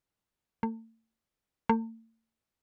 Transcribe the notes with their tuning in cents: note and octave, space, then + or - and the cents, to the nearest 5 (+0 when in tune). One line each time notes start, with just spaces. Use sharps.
A3 +40
A3 +45